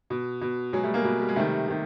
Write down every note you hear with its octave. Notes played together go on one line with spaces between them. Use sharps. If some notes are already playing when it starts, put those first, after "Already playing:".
B2
B2
B2 F#3 G#3
G3 A3
G#3 A#3
B2
G3
G#3
C3 D#3 G3 A3
C3 D#3